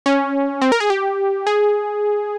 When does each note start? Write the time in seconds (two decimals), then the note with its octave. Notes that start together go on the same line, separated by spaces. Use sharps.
0.06 C#4
0.62 C4
0.72 A#4
0.80 G#4
0.90 G4
1.47 G#4